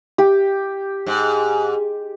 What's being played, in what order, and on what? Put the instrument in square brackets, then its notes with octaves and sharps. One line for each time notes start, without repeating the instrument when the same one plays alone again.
[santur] G4
[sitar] G#2